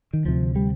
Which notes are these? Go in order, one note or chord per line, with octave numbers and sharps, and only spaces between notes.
D#3
D2 C3 F3
G3